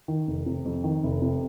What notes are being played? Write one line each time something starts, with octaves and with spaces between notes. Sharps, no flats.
D#3
F1
C3
F2
D#3
F1
C3